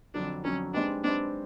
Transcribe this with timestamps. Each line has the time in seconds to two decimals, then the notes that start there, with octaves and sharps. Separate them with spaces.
0.14 F2 D3 F#3 D4
0.44 F2 D3 F#3 C#4
0.74 G#3 C4 D4 D#4 G4 B4
1.03 G#3 C4 D4 D#4 G4 B4